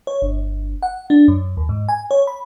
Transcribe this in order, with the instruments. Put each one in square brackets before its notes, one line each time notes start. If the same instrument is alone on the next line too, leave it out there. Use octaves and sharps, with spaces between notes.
[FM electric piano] C#5
G1
F#5
D4
F#2
D#2
G#2
G#5
C#5
B5